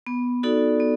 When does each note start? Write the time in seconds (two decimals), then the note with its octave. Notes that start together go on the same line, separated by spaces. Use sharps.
0.07 B3
0.43 D#4 F#4 A4 D5
0.80 B3